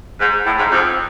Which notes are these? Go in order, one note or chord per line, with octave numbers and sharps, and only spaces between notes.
G#2
A2
G#2
F2